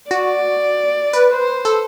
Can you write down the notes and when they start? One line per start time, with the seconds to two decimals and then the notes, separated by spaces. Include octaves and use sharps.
0.11 F#4 D5
1.13 B4
1.34 C5
1.65 A4